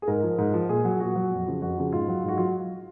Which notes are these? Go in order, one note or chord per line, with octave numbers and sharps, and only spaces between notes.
G#4
G#2 A#4
F3
G#2
F3
A#2 G#4
F#3
A#2 F#4
F#3
F2
C#3 F3
F2 F#4
C#3 F3
G#2 F4
F#3
G#2
F#4
F#3 F4